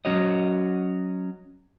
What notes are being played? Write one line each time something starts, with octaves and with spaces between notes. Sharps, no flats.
F#3 C#4 F#4 C#5 D#5